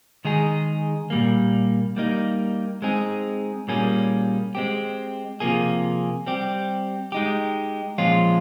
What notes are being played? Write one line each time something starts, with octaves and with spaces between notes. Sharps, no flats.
D#3 G#3 D#4 G#4
A#2 G3 A#3
G3 A#3 D#4
G#3 C4 D#4 G#4
A#2 G3 A#3 C#4 G#4
G#3 C4 G4
C3 F3 A#3 F4 G#4
G3 C4 G4
G#3 D#4 G4
A#2 F3 G#3 C#4 F4